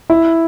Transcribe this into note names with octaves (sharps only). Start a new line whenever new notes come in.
E4